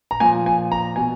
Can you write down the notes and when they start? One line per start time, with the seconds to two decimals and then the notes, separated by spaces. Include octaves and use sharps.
0.11 A#5
0.20 A#2 F3 G#5
0.46 G#5
0.72 A#5
0.96 B2 G#5